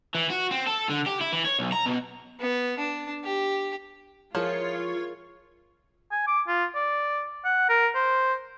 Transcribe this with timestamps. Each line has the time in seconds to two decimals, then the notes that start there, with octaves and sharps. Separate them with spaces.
0.15 E3
0.30 F#4
0.51 C4
0.66 A4
0.89 D3
1.06 G4
1.21 E4
1.32 E3
1.44 C#5
1.59 B1
1.72 A#5
1.86 B2
2.39 B3
2.79 D4
3.24 G4
4.35 F3 E4 F4 G#4 A#4 C#5
6.12 G#5
6.27 D6
6.48 F4
6.75 D5
7.45 F#5
7.69 A#4
7.95 C5